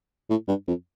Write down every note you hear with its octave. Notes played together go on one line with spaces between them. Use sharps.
A2
G2
F2